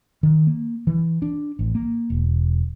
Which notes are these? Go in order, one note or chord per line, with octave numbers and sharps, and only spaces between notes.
D#3
A#3
E3
D4
A1
A#3
E1